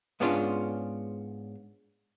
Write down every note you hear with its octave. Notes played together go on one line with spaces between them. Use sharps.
G#2 B3 C#4 D4 F4